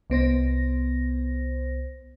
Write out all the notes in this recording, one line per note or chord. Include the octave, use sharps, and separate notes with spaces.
C2 B3 C5 A#6